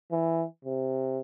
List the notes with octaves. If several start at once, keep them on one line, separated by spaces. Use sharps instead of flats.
E3
C3